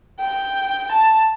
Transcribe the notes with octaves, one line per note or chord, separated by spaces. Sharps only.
G5
A5